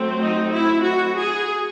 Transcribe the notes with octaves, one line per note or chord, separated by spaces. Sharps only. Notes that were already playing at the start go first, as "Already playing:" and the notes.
Already playing: F#3 A3 C4
D#4
E4
F#4
G#4